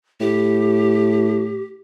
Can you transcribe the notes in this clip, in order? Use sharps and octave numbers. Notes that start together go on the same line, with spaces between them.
A2 G4